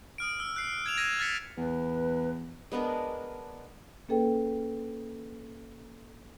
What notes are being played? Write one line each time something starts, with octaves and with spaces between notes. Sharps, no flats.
D#6 F6 D7
E6
F#6 C7
G#6 D7 E7 F7
G#6 A#6 D#7 E7
F6 G#6 A6 B6 C#7
E2 B4
G#3 B3 D4 A#4
A#3 C#4 G#4 A4 B4 G5